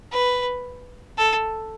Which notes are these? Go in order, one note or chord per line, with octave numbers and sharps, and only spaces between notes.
B4
A4